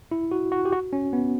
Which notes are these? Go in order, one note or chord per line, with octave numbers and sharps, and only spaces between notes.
E4
F#4
F#4
G4
F#4
C#4
B3